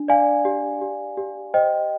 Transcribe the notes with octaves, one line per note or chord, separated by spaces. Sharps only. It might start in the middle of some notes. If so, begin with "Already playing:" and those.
Already playing: D4
D5 F5 G#5
G4
G4
G4
C5 D#5 G5